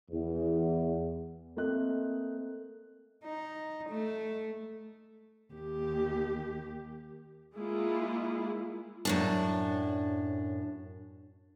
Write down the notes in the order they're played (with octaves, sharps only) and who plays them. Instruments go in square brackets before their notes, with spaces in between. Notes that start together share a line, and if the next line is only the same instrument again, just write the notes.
[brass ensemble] E2
[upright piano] A3 A#3 C4 D#5 F#6
[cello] D#4
A3
D#2 G4
[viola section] G#3 A#3 E4 F4
[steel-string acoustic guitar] F#2 A2 D4